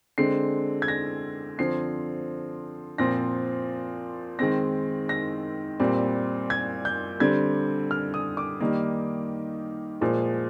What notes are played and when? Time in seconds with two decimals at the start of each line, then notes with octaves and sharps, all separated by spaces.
0.18 D3 G#3 C4 C7
0.82 G#6
0.88 A#6
1.58 D3 F3 C4 C7
2.98 A#2 F3 C4 A#6
4.39 D#3 G#3 C4 A#6
5.09 A#6
5.80 A#2 G3 C4
6.50 G#6
6.85 G6
7.20 D3 G3 C4 G#6
7.91 F6
8.14 D#6
8.37 D6
8.60 D#3 G3 A#3
10.01 A#2 F3 G#3